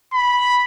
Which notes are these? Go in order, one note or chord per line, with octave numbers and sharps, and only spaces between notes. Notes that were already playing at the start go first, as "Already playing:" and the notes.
B5